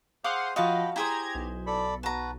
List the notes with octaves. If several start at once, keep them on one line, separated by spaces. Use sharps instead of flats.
G#4 C5 F5 F#5 C6 D6 D#6
F3 F#4 D#5 F5 G5 A5 B5
E4 G4 G#4 C5 G5 A#5 G#6
B1
A4 D5 B5
F#4 B4 A5 A#5